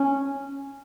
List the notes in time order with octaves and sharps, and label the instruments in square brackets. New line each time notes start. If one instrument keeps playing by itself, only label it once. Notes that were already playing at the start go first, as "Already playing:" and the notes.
Already playing: [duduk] C#4